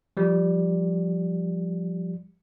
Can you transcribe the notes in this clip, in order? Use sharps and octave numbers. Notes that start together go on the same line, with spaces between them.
F3 G3